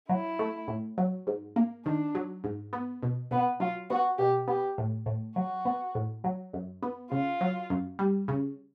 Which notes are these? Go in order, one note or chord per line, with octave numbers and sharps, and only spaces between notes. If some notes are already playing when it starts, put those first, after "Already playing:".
F#3 E4
A3
A2
F#3
G#2
A#3
D#3 D4
F#3
G#2
B3
B2
B2 B3
F#3 F4
B3 F#4
B2 G4
B3 G4
A2
A2
F#3 F#4
B3
A2
F#3
F#2
B3
C#3 F4
F#3
F#2
G3
C#3